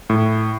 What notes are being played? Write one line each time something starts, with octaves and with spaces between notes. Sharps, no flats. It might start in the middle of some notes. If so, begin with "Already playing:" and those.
A2